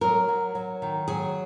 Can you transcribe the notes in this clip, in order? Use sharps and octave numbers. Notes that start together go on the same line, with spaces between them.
F#3 A#4
F#3
F#3
D#3
F#3 G#4